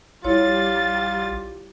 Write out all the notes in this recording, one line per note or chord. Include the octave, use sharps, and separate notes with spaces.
A#1 G3 E4 F4 C#5 A6